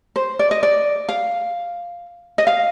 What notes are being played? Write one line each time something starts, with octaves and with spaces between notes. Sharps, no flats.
C5
D5
D#5
D5
F5
D#5
F5